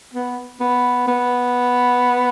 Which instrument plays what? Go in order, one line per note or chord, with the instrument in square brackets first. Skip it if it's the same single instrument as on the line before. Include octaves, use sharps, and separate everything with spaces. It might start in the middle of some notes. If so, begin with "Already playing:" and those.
[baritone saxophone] B3
B3
B3